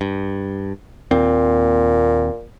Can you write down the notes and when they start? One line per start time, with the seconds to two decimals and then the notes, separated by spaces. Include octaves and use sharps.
0.01 G2
1.11 D#2 A#2 C4